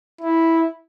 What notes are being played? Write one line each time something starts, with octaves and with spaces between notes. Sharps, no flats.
E4